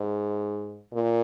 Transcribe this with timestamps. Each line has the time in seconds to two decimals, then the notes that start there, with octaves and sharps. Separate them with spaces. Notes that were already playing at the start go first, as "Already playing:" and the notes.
Already playing: G#2
0.93 A#2